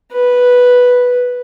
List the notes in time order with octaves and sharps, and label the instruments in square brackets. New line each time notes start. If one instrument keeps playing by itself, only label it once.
[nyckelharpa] B4